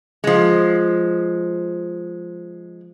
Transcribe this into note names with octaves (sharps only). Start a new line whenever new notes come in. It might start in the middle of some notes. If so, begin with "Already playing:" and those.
F3 G#3